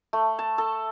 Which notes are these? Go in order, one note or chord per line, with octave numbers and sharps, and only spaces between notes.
A3
A5
A4